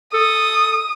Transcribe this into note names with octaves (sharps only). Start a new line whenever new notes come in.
A4 D#6